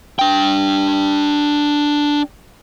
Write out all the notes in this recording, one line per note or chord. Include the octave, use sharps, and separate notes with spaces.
D4 G5